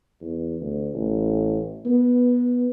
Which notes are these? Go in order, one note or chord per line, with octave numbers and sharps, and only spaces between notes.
E2
D2
A1
B3